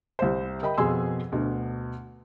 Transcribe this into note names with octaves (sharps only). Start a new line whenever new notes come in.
C2 C5
A#4 D#5 G5 B5
F2 B2 G#4 G#5 C6 E6
D2 B2